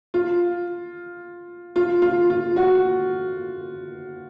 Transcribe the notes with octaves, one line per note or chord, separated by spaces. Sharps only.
F4
F4
F4
F4
F#4